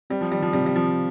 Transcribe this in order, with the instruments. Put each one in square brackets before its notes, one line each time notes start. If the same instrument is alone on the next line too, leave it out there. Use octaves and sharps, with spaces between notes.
[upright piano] G3 [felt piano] C4
[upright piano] F3
[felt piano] D#3 [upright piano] G3
[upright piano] F3
[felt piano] C3 [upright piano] G3
[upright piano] G3
[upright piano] F3 [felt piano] C4